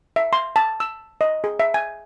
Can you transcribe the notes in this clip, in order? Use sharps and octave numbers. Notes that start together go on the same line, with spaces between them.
E5
C6
A5
E6
D#5
G#4
E5
G#5